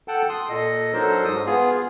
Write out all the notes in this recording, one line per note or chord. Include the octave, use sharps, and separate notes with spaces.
A4 F#5 G5 A5
C6 D#6
A#2 A4 D#5
F#3 D4 D#4 A4 A#4 C5
G#2 D#6
B3 F4 G#4